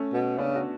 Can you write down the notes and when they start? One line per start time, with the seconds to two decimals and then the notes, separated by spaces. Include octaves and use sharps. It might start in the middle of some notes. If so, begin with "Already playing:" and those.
Already playing: A3 C#4
0.13 B2
0.38 C#3 B3 D4
0.55 D4 F#4